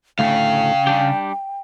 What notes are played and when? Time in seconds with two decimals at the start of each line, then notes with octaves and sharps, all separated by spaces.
0.19 D2 A2 C#3 A3 F5 G5
0.87 G3 D4 G4